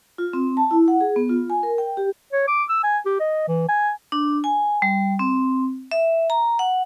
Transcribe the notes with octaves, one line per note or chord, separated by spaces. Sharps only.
F4
C4
A5
E4
F#5
G#4
B3
F4
G#5
A#4
G5
G4
C#5
D6
E6
G#5
G4
D#5
E3
G#5
D4
G#5
G3
C4
E5
A#5
F#5